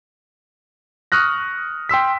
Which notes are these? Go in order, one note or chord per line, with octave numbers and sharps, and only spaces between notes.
C#6 D#6 F6 F#6 A#6
G5 C6 E6 B6